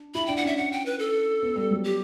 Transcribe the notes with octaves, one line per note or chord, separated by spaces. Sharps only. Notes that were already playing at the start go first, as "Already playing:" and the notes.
Already playing: D4
E4 B5
D4 G5
F#5
C#4 E5
F#5
G5
B4
A4
B3
G3
F#3
G4